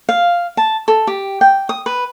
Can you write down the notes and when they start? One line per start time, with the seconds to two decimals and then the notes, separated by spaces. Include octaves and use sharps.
0.09 F5
0.57 A5
0.88 A4
1.07 G4
1.41 G5
1.69 D#6
1.86 B4